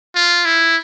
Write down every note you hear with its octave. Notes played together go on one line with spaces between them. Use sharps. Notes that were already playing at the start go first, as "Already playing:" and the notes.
F4
E4